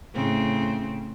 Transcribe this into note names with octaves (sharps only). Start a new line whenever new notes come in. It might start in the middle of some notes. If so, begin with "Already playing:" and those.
A2 C#3 C4